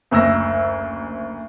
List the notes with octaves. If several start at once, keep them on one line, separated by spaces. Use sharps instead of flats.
F#1 D2 E6 A#6